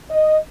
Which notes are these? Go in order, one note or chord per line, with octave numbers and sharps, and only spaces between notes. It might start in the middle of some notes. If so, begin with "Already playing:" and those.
D#5